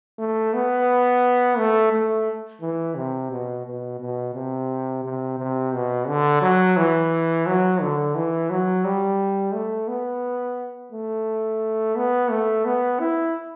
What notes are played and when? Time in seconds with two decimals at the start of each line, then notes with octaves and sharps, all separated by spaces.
0.19 A3
0.54 B3
1.58 A3
1.93 A3
2.62 E3
2.95 C3
3.31 B2
3.65 B2
4.00 B2
4.35 C3
5.04 C3
5.38 C3
5.73 B2
6.08 D3
6.42 F#3
6.77 E3
7.47 F#3
7.81 D3
8.15 E3
8.50 F#3
8.85 G3
9.54 A3
9.88 B3
10.92 A3
11.96 B3
12.31 A3
12.66 B3
13.00 E4